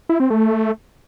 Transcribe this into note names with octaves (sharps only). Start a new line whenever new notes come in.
E4
C4
A3